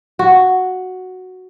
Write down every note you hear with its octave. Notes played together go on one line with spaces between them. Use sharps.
F#4